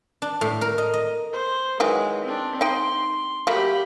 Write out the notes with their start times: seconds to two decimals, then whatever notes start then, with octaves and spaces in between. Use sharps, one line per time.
0.22 D4
0.41 A2
0.61 A#4
0.78 D#5
0.94 D#5
1.33 C5
1.80 D#3 E3 F#3 G#3
2.24 C4 D4
2.61 D#4 G5 C6
3.47 F#3 A3 A#3 G4 B5